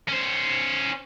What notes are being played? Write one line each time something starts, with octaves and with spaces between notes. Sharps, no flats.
C#4 C5